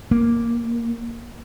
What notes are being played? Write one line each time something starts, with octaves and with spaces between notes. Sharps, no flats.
A#3